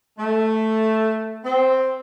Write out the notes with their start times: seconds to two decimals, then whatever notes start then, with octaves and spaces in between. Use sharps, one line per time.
0.19 A3
1.45 C4